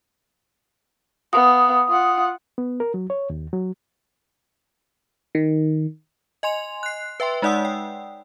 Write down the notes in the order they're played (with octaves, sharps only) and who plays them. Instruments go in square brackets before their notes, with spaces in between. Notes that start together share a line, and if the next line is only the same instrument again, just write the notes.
[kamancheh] B3 F5 [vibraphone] D#6
[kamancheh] F4 F#5
[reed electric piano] B3
A#4
F#3
C#5
D#2
F#3
[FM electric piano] D#3
[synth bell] D#5 G#5 C6 F7
F#6 C7
B4 E5 G5 C6
G#3 D#4 D5 F#5 D#6 E6
G5